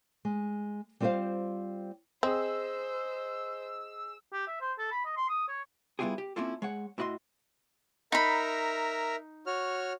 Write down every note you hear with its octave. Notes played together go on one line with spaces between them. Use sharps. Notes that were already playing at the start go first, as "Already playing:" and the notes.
G#3
G3 C4 F4 B4 C5 F5
C4 G#4 C5 D#5 E6
G4
E5
C5
A4
B5
D#5
C6
D#6
C#5
G3 B3 E4 F4 G4 G#4
G4
A#3 C4 C#4 E4 F4 A4
G#3 C#5 F#5
A2 E4 F#4 D#5 C6
D#4 A#4 E5 A#5 B5
F#4 C#5 F6